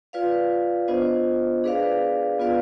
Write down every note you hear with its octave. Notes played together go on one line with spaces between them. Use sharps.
F4 B4 D5 F5
B3 D4 F4 C5 D#5
D4 G#4 B4 D5 F5
B3 F4 B4 D5 F5